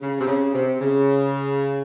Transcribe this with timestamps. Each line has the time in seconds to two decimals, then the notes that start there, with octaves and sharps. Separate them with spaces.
0.01 C#3
0.20 C3
0.27 C#3
0.53 C3
0.80 C#3